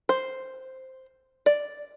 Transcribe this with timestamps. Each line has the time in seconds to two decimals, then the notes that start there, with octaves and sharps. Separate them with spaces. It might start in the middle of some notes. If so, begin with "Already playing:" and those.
0.09 C5
1.46 D5